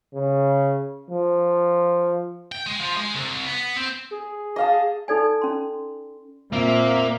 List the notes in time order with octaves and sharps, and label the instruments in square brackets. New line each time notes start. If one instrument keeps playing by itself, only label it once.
[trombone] C#3
F3
[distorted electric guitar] G5
G#3
F3
G#3
C2
B3
C4
[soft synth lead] G#4
[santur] D#5 F5 A5
[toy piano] D#4 A4 D5 G#5
C#4 C6
[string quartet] A#2 [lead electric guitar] A#3 [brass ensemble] C4 E5